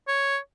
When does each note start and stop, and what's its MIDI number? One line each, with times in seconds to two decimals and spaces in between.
0.08 0.38 73